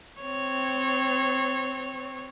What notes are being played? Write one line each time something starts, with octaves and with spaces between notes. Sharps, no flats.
C4 C#5